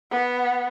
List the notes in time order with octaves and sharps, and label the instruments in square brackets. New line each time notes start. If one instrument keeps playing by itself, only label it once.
[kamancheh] B3